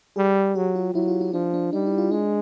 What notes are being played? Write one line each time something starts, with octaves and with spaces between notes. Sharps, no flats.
G3 G#4
F#3 G4
F4
F#3 E4
F4
E4
F3 D4
D4
G3 D#4
E4
F4
G#3 D4